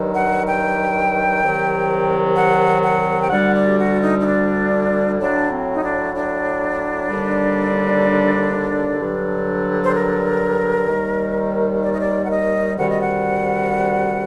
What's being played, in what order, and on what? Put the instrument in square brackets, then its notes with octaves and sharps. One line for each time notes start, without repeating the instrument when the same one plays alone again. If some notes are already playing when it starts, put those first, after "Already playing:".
Already playing: [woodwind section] G2 D#3 F#3
F#5
G5
C2 C3 D#3 F#3
F#5
F#5
G5
D2 D3 G3 F#5
D5
G4
F#4
D#4
D#4
D4
A2 F#3 D4
C4
D#4
D4
D4
D#2 D3 G3
G2 D3 F#3
C5
A#4
D#2 D#3 G3
D5
D#5
D5
F#5
D#5
D2 C3 D#3 G3 F#5
D#5
F#5